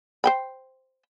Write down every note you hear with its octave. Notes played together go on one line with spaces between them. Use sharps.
C5 G5 B5